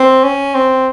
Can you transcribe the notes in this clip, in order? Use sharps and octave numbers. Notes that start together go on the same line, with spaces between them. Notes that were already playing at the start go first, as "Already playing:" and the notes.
Already playing: C4
C#4
C4